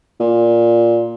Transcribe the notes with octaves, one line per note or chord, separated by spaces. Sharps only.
A#2